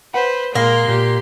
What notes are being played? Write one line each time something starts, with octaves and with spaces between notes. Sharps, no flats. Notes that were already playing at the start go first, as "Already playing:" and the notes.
B4 C5 F#5
A#2 G#3 A#3 A#4 C6
A#2 G4